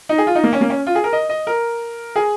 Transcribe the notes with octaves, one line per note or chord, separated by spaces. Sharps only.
D#4
G#4
F4
D#4
A#3
C#4
A#3
C#4
F4
G#4
A#4
D#5
D#5
A#4
G#4